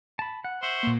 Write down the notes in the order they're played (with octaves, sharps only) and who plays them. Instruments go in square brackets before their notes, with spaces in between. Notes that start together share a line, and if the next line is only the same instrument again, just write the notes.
[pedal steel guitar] A5 B5
F#5
[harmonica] C5 E5 F#5 [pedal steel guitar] C6 C#6
[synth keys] A#2 A#3